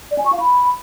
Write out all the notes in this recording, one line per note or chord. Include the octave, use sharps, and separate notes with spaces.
D5
G#5
C#6
F5
B5